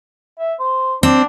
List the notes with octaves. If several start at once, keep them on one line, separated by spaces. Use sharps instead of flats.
E5
C5
C4 D4